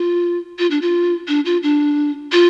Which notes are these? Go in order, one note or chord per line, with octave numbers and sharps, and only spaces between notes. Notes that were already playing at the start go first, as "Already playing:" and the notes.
Already playing: F4
F4
D4
F4
D4
F4
D4
F4